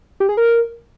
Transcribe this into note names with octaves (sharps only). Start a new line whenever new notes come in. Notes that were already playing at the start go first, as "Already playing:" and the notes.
G4
G#4
A#4